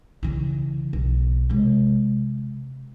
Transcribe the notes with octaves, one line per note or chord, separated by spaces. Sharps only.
C#3 E3
B1
C3 G#3